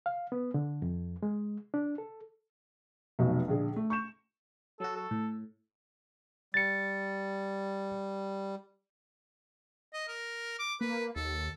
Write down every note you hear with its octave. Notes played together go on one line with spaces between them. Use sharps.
F5
B3
D3
F2
G#3
D4
A4
F1 B1 B2 F#4
A#1 D3 G#4
A3
C#6 G6 E7
F#3 F#4 A4
A4
A2
G3 A6 C#7
D#5
A#4
D6
A#3 B4
D#2 A4